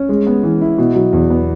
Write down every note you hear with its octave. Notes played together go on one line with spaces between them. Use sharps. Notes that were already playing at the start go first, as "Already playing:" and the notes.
Already playing: C#4
G#3
B3
E3
E4
B2
F#3
E2
B3